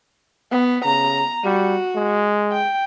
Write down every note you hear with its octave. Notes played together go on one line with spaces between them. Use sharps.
B3
C#3 A#5
G3 F#4
G#3
G5